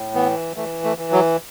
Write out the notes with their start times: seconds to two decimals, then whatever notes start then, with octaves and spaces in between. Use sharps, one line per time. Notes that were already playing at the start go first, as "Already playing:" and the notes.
Already playing: A2
0.14 E3 B3
0.56 E3 A3
0.84 A3
0.98 E3
1.12 F#3